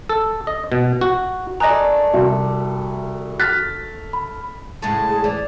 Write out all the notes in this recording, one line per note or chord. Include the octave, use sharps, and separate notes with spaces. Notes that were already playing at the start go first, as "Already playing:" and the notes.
A4
D#5
B2
F#4
D#3 A3 D5 D#5 G#5 A#5 D#6 F#6
C2 F#4
F6 F#6 A6 B6
B5
A2 C#3 G#3 A5
G#4
E3 D5